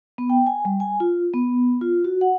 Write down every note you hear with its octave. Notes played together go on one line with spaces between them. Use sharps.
B3
G5
G#5
G3
G#5
F4
B3
F4
F#4
F#5